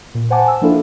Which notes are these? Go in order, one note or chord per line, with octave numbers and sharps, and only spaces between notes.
A#2
C5 F#5 G#5 A5 D6
E6
F3 A#3 D4 E4 F4 A4